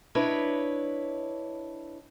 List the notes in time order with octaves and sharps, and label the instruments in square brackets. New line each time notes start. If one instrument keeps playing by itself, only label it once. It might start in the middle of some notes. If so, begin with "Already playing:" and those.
[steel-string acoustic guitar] D4 E4 B4 C#5 D#5